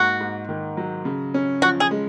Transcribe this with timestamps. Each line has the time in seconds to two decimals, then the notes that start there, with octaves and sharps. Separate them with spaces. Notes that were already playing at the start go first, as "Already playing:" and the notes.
Already playing: G#2 A#3 F#4
0.20 G#2
0.49 D#3
0.77 F#3
1.05 C#3
1.34 C#4
1.62 F3 F#4
1.80 G#4
1.91 G#3